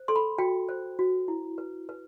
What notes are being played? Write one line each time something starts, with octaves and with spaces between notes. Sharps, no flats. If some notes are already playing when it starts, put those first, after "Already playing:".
Already playing: C5
A4 C6
B5
F#4 G5
C5
F#4
E4
B4
B4